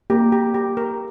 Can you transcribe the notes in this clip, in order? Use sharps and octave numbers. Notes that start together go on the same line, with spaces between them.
A#3 G4
G4
G4
A#4